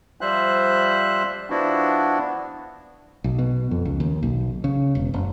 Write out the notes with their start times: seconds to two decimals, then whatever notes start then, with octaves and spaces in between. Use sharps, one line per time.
0.21 F3 G3 C5 E5 F#6
1.50 F3 B3 D4 E4 F#4
3.24 B1
3.39 B2
3.71 F2
3.85 C#2
4.00 D#2
4.23 B1
4.64 C#3
4.95 E1
5.14 F#1